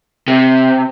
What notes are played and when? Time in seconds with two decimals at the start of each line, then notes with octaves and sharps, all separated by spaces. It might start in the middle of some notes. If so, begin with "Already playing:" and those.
0.28 C3